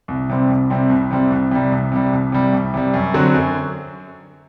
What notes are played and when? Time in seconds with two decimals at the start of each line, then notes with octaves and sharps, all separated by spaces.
0.08 C2
0.29 C3 G3 C4
0.49 C2
0.70 C3 G3 C4
0.90 C2
1.10 C3 G3 C4
1.31 C2
1.51 C3 G3
1.72 C2
1.92 C3 G3
2.13 C2
2.32 C3 G3
2.53 C2
2.74 C3 G3
2.94 F#2
3.14 D3 F#3 C4 F#4
3.34 F#2